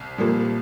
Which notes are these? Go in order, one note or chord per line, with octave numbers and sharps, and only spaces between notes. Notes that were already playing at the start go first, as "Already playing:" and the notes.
Already playing: C2
A#2 F3 G3 A#3